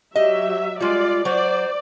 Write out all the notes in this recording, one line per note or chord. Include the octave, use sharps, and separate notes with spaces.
F#3 G4 D#5 E5
G3 G#3 F4 D5
F#3 C5 D5